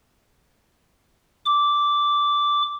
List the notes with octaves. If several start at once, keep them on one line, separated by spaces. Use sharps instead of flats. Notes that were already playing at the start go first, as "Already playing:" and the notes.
D6